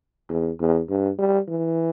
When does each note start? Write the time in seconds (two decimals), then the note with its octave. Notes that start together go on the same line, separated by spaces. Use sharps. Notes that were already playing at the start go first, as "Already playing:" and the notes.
0.30 E2
0.60 E2
0.89 G2
1.18 G3
1.49 E3